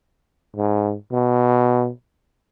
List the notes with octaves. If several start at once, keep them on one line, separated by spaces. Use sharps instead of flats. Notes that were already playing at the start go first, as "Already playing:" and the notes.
G#2
B2